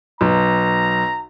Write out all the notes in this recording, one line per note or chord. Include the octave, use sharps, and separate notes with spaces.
B1 A#5